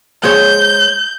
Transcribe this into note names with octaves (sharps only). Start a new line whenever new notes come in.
G#3 C5 C#5 G6